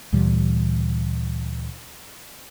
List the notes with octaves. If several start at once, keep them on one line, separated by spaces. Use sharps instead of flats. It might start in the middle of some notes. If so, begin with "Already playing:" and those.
D2 A#2 E3 G3